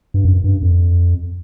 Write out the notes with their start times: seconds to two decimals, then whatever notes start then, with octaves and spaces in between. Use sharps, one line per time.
0.14 G2
0.25 F#2
0.44 G2
0.62 F2